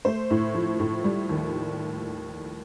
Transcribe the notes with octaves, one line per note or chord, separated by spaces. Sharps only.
A3 C5
A2
F3
A2
G3
D#2